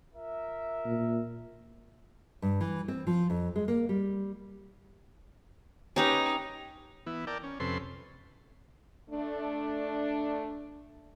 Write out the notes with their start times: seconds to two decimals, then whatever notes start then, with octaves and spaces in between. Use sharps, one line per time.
0.15 F4 A#4 E5
0.85 A#2
2.42 G2
2.61 E3
2.88 C4
3.07 F3
3.30 F2
3.56 G#3
3.68 A#3
3.89 G3
5.96 C#4 D#4 G4 B4
7.07 E3 B3 E4
7.27 A#4 D5 G5 A5
7.43 C#4
7.60 F2 C3 C#4 A4 B4 C6
9.10 A3 D4